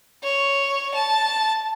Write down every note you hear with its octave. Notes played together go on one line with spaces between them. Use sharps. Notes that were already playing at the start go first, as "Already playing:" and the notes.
C#5
A5